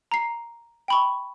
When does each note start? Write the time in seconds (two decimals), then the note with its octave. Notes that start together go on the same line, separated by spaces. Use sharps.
0.12 A#5 C7
0.88 G5 B5 C#6